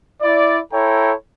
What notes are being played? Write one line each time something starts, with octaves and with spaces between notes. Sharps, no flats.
E4 D5
E4 A4 C#5 G5 A#5